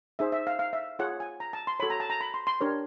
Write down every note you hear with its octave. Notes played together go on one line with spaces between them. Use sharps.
D#4 G#4 C5 E5
E5
F5
F5
E5
F4 G#4 C#5 F#5
G#5
A#5
A5
C6
F#4 A4 C#5 B5
A#5
A5
A#5
B5
C6
C6
D4 G4 A#4 C#5